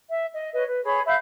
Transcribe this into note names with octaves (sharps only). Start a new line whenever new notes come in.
E5
D#5
B4 C#5 D#5
B4
G#4 C#5 B5
E5 F5 B5 G6